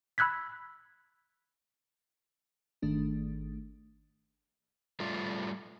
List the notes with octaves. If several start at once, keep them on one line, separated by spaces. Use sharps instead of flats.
B5 E6 F#6 G#6 B6
G#1 D#3 A3 D4
G3 A3 F4